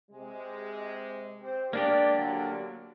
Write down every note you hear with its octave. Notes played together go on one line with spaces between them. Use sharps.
C3 G#3
C4 G4 C5
G#3 A#3 D4 G4 D5
D3 F#3